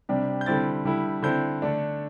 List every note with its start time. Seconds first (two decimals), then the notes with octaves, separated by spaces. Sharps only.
0.09 C3 G3 D4
0.41 G6
0.46 D3 G3 C4 E4 A6
0.85 D3 G3 E4
1.23 D3 C4 E4 G6
1.62 D3 A3 D4